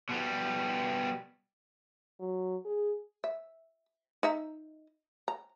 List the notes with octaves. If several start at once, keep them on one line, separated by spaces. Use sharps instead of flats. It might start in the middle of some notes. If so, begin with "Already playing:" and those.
B2 G3
F#3
G#4
E5
D#4 E5 A#5
A#5